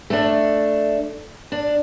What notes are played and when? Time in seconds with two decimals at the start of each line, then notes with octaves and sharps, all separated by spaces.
0.10 A3 D4
1.52 D4